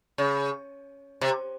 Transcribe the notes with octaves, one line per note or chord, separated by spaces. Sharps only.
C#3
C3